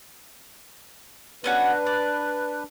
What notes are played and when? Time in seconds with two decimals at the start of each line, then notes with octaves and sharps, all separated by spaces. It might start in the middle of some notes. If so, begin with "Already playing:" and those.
1.44 B3 C#4 D4 F#4 B4
1.87 D5